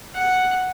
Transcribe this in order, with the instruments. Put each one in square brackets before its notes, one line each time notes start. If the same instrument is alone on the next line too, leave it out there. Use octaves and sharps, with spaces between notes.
[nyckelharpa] F#5